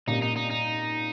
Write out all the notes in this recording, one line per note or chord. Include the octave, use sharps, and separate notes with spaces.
A#2 G3 A#3 C#4 D#4
D#4
D#4
D#4